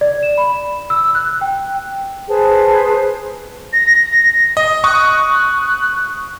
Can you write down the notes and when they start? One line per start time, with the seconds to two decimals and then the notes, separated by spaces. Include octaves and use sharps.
0.01 D5
0.23 E7
0.38 B5
0.90 E6
1.15 F#6
1.41 G5
2.28 G#4 B4 C5 A5
3.73 A#6
4.57 D#5
4.84 C#6 D#6 F#6